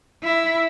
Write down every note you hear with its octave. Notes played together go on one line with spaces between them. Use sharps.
E4